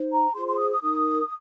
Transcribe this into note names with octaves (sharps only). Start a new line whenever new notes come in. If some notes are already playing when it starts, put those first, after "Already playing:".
Already playing: D#4 C5
A#5
F4 G#4 C5 C6
C6
D#6
D#6
D#4 A#4 D#6